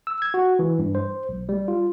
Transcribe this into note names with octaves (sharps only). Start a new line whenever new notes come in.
E6
G#6
F#4
E3
G2
C5
B1
G3
F4